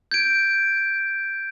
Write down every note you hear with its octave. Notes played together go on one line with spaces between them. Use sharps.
G6 G#6 D7